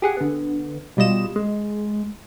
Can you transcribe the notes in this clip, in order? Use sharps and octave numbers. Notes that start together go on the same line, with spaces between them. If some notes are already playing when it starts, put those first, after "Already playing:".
G4 G#4 F#5
D3 B3
B2 G3 F4 D#5 E7
G#3